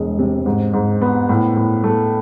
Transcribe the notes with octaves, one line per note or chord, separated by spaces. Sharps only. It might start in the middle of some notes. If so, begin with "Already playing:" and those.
Already playing: E1 G#3
C3
G#2
G#2
B3
A2
A2
A3